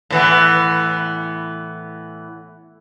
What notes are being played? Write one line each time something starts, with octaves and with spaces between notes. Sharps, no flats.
A2 E3 B3